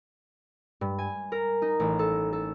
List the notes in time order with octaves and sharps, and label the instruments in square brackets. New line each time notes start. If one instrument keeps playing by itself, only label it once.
[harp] G2
G#5
A#4
D#4
A1
A4
A4